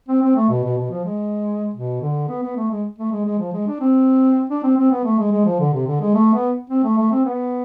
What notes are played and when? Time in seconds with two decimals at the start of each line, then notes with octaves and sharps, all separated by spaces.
0.09 C4
0.23 C4
0.36 A3
0.50 B2
0.64 B2
0.78 B2
0.91 F3
1.05 G#3
1.74 B2
2.02 D3
2.29 B3
2.43 B3
2.57 A3
2.71 G#3
2.98 A3
3.12 G#3
3.26 G#3
3.39 F3
3.53 G#3
3.67 D4
3.80 C4
4.50 D4
4.63 C4
4.78 C4
4.91 B3
5.05 A3
5.19 G#3
5.32 G#3
5.46 F3
5.60 D3
5.73 C3
5.87 D3
6.01 G#3
6.15 A3
6.34 B3
6.70 C4
6.84 A3
6.98 A3
7.11 C4
7.25 B3